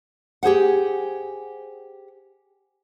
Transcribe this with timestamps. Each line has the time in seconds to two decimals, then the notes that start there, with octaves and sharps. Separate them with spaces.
0.43 G4 G#4 C5 F#5